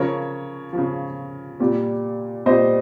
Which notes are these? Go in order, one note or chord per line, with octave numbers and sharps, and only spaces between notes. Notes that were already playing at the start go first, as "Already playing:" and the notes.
Already playing: C#3 F3 A#4 C#5
C#3 F3
A#2 G3
A#2 G3 C5 D#5